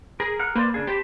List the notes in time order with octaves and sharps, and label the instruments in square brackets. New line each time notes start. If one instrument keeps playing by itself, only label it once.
[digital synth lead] G#4 [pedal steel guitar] A#4
[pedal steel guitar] A#4 F#5
[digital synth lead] A#3 [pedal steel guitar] B4 C5 D5
[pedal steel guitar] C#3 D4 G#4
[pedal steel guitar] C4 A5 B5 [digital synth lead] G4